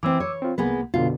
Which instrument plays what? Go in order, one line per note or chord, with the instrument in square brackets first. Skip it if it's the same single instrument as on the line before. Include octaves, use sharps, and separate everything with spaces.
[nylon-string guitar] E3 C4 [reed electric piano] D6 E6
[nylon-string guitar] C#5
[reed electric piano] C4 F4
[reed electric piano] C2 A#3 [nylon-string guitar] G#3 B3 B4
[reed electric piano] F#2 B2 D3 [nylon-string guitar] F4